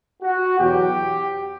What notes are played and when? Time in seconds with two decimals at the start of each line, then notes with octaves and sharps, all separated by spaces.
0.22 F#4
0.59 E2 B2 F#3 G4